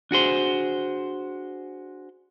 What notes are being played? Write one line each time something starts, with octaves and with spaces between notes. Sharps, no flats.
D4 F#4 G#4 C5